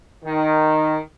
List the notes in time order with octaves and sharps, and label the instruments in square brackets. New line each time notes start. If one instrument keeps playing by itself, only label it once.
[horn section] D#3